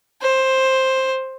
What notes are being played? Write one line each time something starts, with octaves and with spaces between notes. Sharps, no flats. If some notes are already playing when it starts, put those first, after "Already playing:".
C5